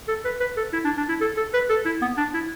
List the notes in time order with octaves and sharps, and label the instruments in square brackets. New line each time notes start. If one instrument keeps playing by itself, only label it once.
[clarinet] A4
B4
B4
A4
E4
D4
D4
E4
A4
A4
B4
A4
E4
B3
D4
E4